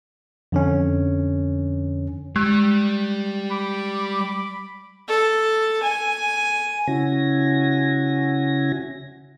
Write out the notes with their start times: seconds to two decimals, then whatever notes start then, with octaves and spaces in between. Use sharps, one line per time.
0.52 F2 D3 C#4
2.36 G3 G#3
3.51 B5 D6
5.08 A4
5.83 G#5
6.87 C#3 C#4 E4 F#4 G#5 A#6